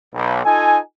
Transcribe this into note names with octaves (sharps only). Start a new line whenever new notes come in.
B1
D#4 F4 A4 G#5